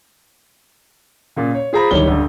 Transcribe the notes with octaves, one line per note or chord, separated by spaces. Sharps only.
A#2 C#3
C#5
F4 G#4 C5 A#5 B5
D1 A2 D#3 G3 C#5 G7
D2 G2